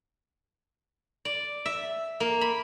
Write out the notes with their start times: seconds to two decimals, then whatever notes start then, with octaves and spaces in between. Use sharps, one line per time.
1.25 D5
1.66 E5
2.20 A#3
2.41 B5